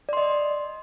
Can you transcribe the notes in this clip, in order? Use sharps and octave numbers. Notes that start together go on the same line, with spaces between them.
D5 D#5 C6